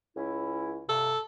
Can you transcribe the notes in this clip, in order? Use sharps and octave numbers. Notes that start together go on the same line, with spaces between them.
C#2 C#4 E4
G2 C3 A4